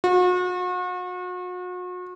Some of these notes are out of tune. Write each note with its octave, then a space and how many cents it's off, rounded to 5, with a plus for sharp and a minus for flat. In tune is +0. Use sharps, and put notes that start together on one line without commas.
F#4 -40